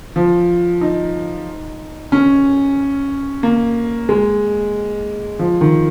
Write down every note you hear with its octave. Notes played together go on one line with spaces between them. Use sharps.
F3
D#4
C#4
A#3
G#3
F3
D#3